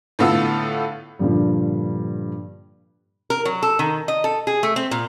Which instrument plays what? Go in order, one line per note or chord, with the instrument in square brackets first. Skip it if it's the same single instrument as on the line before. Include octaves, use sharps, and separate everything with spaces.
[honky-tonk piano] A2 D3 B3 F4 A4 E6
[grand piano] G2 A#2 D3 F3 G3
[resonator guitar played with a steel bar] A#4
F#3
A4
D#3
D#5
A4
G#4
A3
C4
A#2